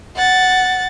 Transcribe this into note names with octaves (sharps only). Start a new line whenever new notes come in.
F#5 A6